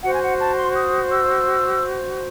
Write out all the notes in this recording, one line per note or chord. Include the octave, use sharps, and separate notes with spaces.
F#4 C5 F#5
G#5
F#5
A5
C6
D#6
E6